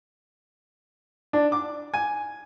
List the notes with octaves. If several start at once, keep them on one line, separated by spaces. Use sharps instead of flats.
D4
D6
G#5